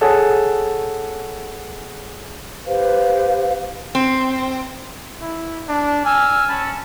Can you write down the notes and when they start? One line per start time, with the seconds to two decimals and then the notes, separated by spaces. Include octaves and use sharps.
0.01 G#4 A4 C#5 F#5 G#5 D#6
2.66 G4 B4 C5 F5
3.95 C4
5.22 E4
5.69 D4
6.05 G#5 E6 F6
6.48 C#4 A5 B5